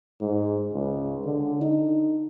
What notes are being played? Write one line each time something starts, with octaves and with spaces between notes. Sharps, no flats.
G#2
C#2
D3
D#4